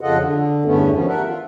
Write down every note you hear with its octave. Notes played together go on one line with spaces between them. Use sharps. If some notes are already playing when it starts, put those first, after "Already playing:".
F2 C#3 F4 A4 D#5 F#5
D3
E2 G2 D3 A3 B3 C#4
D#3 F3 G3 C#4
A3 A4 A#4 E5 F#5
F4